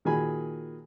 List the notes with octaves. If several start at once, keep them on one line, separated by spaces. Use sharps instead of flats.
A#2 D#3 F#4 G#4 G#5 B5